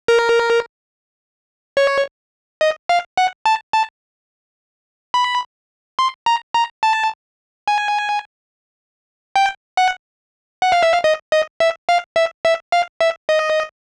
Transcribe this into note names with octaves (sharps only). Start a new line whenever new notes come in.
A#4
C#5
D#5
F5
F#5
A5
A5
B5
C6
A#5
A#5
A5
G#5
G5
F#5
F#5
F5
E5
F5
D#5
D#5
E5
F5
E5
E5
F5
E5
D#5